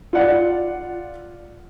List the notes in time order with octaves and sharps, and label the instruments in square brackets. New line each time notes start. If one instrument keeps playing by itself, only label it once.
[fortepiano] F4 D5 F#5